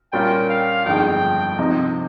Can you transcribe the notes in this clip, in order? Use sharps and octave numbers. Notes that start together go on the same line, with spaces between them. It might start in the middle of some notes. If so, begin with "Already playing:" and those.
A#2 G3 C#4 F4 A#4 G5
F5
G1 F2 D#3 G#3 G5
C3 F3 C4 D#4